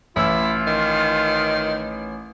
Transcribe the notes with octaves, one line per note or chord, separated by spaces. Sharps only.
A1 E4 F4 E6
D#3